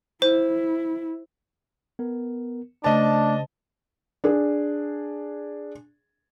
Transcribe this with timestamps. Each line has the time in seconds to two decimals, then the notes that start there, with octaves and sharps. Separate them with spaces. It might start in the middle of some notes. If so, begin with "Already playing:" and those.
0.22 E4 C5
1.99 B3 A#4
2.84 C#3 A3 D4 C5 D#5 A5
4.24 D4 G#4